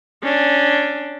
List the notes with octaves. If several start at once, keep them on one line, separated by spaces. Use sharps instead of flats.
C#4 D4